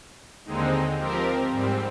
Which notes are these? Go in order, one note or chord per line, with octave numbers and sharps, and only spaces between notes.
D#2 D3 G#3 C4 D#4
F3 C4 G4 A#4
G#2 G3 C4